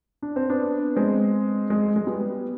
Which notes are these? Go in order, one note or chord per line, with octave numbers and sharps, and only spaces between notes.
D4
C4
B3 D4
G#3 C4
G#3
G#3
G3 B3